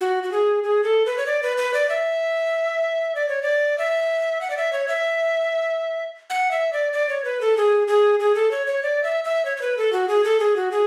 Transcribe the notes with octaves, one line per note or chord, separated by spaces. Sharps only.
F#4
F#4
G#4
G#4
A4
B4
C#5
D5
B4
B4
D5
E5
D5
C#5
D5
E5
F#5
D5
E5
C#5
E5
F#5
E5
D5
D5
C#5
B4
A4
G#4
G#4
G#4
A4
C#5
C#5
D5
E5
E5
C#5
C#5
B4
A4
F#4
G#4
A4
G#4
F#4
G#4